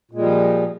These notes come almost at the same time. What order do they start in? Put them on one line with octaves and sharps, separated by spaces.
A#2 G#3 G3 F3